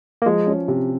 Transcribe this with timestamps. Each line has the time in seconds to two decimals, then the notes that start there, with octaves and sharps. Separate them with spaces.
0.22 A#3
0.26 F3 G#3
0.47 C#4
0.68 C3